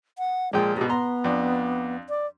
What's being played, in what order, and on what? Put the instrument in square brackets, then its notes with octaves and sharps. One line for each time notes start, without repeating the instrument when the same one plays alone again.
[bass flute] F#5
[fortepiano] A#2 F3 G5 [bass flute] G#3
[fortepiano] G#2 B2 [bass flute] G4
[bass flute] B3 [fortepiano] A#5 C6
[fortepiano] F2 D4
[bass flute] D5